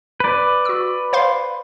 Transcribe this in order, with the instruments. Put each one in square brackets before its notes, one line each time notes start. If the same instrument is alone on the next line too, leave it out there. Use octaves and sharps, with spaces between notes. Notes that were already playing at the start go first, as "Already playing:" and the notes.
[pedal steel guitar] B4 D5
[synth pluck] F#4 E6
C5 F5 C6